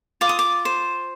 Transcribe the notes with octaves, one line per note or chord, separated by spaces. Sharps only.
F4 D6
D#6
D6
C5